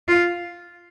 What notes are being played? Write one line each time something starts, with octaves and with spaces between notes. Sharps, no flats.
F4